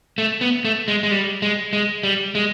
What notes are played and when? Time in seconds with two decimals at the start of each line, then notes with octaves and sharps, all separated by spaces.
0.18 A3
0.41 B3
0.65 A3
0.88 G#3
1.03 G#3
1.11 G3
1.42 G#3
1.73 G#3
2.03 G3
2.35 G#3